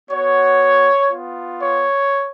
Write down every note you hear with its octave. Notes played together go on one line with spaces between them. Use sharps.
B3 F#4 C#5
B3 F4
C#5